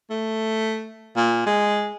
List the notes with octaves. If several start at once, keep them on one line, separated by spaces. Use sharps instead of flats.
A3
A#2
G#3